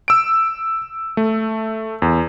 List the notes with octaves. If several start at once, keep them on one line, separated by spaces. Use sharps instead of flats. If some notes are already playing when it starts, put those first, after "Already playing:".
E6 D7
A3
E2